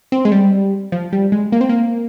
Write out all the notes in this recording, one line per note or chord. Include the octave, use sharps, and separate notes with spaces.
C4
G#3
G3
F3
G3
G#3
A#3
C4
A#3